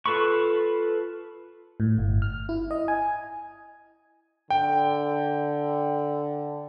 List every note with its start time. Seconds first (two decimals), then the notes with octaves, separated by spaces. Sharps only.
0.06 F4 A4 B4 B5 C#6
1.80 A2
1.98 G1
2.22 F6
2.49 E4
2.71 D#5
2.88 G#5
4.50 D3 G5